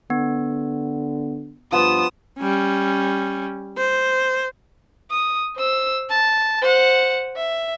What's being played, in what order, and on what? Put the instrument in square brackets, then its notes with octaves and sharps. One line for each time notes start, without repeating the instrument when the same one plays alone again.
[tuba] D3 [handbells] B3
[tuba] G2 [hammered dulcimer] F3 B3 [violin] D#6 E7
[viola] G3 C#4
C5
[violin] D#6
C5 E6
A5
C5 F#5
E5